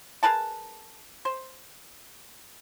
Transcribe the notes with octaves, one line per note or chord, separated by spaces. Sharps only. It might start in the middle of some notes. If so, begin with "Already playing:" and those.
G#4 A#4 B4 A5
C5